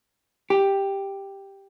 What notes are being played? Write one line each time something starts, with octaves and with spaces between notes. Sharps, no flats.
G4